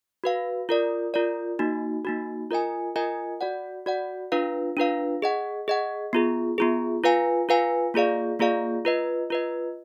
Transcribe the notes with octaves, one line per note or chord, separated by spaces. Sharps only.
F#4 B4 F5
F4 A#4 D5
F4 A#4 D5
A#3 D#4 F#4
A#3 D#4 F#4
F4 A#4 D#5 G#5
F4 A#4 D#5 G#5
F#4 D5 F#5
F#4 D5 F#5
D4 F4 B4 F5
D4 F4 B4 F5
G#4 D#5 F#5
G#4 D#5 F#5
B3 F4 G#4
B3 F4 G#4
F4 B4 F5 G#5
F4 B4 F5 G#5
A#3 F4 G#4 D5 F5
A#3 F4 G#4 D5 F5
F4 B4 D#5
F4 B4 D#5